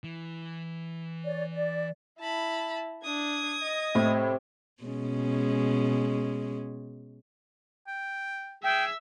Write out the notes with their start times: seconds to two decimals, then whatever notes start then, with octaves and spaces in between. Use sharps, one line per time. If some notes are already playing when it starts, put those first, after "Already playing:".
0.04 E3
1.25 C#5 D5
1.53 D5
2.20 E4 A5 B5
3.04 D4 D#6 G#6
3.63 D#5
3.95 A2 C3
4.83 B2 G#3 C#4
7.87 G5
8.64 G#4 E5 G5 E6